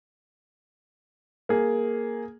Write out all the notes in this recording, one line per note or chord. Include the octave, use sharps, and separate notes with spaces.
A#3 G#4